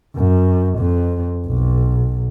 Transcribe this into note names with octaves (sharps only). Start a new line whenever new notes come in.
F#2
F2
B1